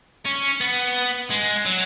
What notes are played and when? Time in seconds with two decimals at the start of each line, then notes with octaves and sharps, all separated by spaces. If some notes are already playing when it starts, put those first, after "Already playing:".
0.26 C#4
0.61 B3
1.30 G#3
1.65 F#3